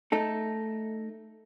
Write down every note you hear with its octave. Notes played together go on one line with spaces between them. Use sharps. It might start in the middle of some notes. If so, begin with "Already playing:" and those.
A3 D#4 A4